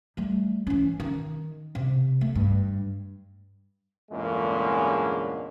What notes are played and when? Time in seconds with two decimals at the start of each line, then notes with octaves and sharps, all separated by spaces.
0.17 G3 A3
0.67 E3 C#4
1.00 D#3
1.75 C3
2.21 A3
2.35 G2
4.12 E2 G2 A#2 D3 G#3 C#4